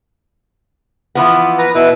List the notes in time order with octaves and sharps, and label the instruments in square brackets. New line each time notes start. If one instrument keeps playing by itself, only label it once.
[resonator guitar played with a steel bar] E3 F3 B3
[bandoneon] B4 A#5
B2 E4 B4